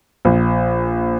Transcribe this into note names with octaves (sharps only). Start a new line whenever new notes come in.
A#1